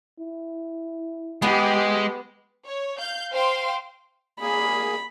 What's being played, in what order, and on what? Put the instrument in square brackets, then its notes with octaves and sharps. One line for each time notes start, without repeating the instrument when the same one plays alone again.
[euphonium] E4
[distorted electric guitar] G#3 [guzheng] B3 [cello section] G4
[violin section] C#5
F5 G6
C5 F5 G5 C6
[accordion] A#3 G#4 [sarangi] B5